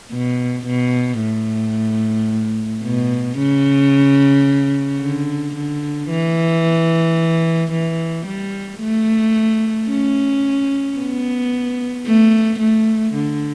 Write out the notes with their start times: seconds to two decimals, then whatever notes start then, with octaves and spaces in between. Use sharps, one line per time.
0.12 B2
0.67 B2
1.21 A2
2.83 B2
3.38 C#3
5.00 D3
5.55 D3
6.09 E3
7.72 E3
8.26 G3
8.80 A3
9.89 C#4
10.97 B3
12.06 A3
12.60 A3
13.14 D3